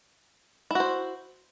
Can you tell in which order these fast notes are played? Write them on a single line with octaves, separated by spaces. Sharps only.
E4 F#4 C5